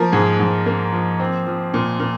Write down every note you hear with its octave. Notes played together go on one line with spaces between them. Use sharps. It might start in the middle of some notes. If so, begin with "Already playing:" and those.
Already playing: F3 A#3 A#4
G#2 G#4
G#2
A#3
F3
C4
F3
A#2
A#2